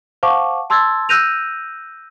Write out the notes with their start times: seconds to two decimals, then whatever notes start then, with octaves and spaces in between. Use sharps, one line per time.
0.23 C5 F5 F#5 A5 C#6 D6
0.70 A5 C6 E6 G#6 A6
1.09 E6 F#6 G6 A#6 D#7 F7